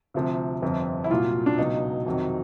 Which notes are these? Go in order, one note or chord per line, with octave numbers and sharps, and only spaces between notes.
D2 C3 F3
G1 F2 C3 F3
E4
C2 A#2 F#3 F4
D4
C#2 B2 F#3 D#4
F2 C3 D#3 F#3